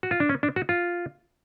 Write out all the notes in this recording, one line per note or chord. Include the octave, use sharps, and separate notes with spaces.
F#4
F4
D4
C#4
D4
F#4
F4